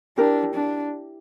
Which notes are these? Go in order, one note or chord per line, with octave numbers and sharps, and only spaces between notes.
D4 E4 G4 A#4
D4